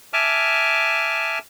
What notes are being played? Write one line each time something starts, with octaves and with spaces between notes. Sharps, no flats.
E5 G#5 A5 D6 F6